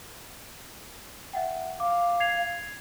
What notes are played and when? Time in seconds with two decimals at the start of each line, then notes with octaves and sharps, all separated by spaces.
1.33 E5 F#5 G5
1.80 F5 D6
2.20 G#6 C7 F7